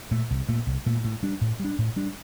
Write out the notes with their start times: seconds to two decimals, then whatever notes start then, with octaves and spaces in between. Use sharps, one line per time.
0.11 A#2 A3
0.30 C2
0.49 A#2 A3
0.67 C2
0.86 A#2 A3
1.04 A2
1.23 G3 D4
1.41 A2
1.60 G3 D4
1.78 A2
1.96 G3 D4